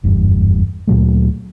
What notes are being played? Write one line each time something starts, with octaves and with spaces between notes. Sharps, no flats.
F#1 E2 G2
D2 A#2 F#3 A3